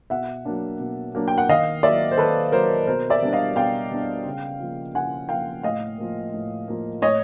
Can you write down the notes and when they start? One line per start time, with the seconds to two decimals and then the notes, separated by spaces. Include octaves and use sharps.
0.10 B2 E5 F#5
0.45 F#3 A#3 D4
0.79 B2
1.14 F#3 A#3 D4
1.28 G5
1.38 F#5
1.49 D#3 D#5 F5
1.83 F#3 A#3 D5 E5
2.11 C5
2.17 D#3 A4 B4
2.52 F#3 A#3 A#4 C5
2.87 B2 A#4 C5
3.10 D5 E5
3.22 G3 B3 D4
3.33 D#5 F5
3.56 B2 F5 G5
3.92 G3 B3 D4
4.25 C#3
4.60 F3 A#3
4.94 C#3 F#5 G#5
5.29 F3 A#3 F5 G5
5.63 A2 D#5 F5
5.98 F3 A#3
6.34 A2
6.68 F3 A#3
7.02 A2 C#5 D#5